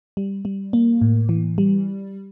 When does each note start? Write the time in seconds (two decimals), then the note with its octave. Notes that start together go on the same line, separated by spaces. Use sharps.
0.17 G3
0.45 G3
0.73 A#3
1.01 A2
1.29 E3
1.58 G3